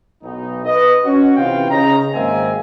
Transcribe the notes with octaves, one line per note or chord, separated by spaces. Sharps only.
B1 D#4
B4 D#5
C#4 F#4
C3 E3 C4 F4 F5 G5
C#3 D#4 A#5
G#1 G#3 A#3 C4 E5 G#5